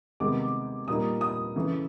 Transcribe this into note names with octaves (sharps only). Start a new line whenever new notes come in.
C3 D#3 G#3 B3 D6
A#2 G3 A#3 D#4 D#6
D#6
C#3 E3 A3